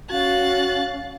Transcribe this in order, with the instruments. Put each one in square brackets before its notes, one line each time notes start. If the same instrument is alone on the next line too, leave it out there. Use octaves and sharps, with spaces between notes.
[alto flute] C#4 [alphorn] F#4 [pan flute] F5 [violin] F#6 A6